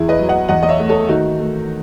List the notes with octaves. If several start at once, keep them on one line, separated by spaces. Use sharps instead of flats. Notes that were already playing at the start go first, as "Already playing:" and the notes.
Already playing: E2 E4 G#4
B4 D#5
F#3
D#5 F#5
E2 D#5 F#5
D#5
C#5 E5
A3
A4 C#5
D#3 D#4 F#4
A3